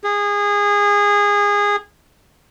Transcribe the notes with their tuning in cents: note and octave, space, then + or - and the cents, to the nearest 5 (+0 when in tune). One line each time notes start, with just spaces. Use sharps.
G#4 -25